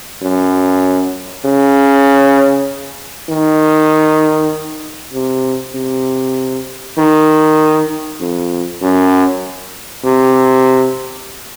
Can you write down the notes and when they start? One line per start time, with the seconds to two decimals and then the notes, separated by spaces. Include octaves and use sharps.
0.22 F#2
1.45 C#3
3.29 D#3
5.13 C3
5.74 C3
6.98 D#3
8.20 F2
8.81 F#2
10.04 C3